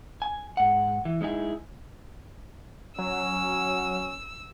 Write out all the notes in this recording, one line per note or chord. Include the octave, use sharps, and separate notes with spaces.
G#5
G#2 F#5
E3
G#3 D#4 E4 G#4
F#3 C#4 E6